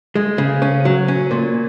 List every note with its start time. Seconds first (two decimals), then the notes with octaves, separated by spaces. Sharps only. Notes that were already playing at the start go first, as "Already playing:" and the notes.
0.15 G#3
0.38 C#3
0.62 C#4
0.85 F#3
1.08 C#4
1.31 A#2